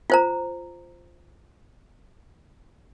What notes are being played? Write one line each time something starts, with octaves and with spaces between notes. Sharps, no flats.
F4 C5 A#5